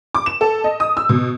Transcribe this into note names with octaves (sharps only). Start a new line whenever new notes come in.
D6
E7
A4
D#5
D#6
E6
B2